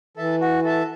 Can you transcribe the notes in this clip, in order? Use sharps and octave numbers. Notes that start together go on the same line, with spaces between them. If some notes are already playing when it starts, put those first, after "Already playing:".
E3 A4 E5 A5
F#4
A4 E5 A5